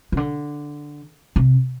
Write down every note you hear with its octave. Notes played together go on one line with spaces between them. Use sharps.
C#3
D3
C3